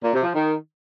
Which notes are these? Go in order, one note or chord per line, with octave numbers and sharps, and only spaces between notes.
A#2
C3
F3
D#3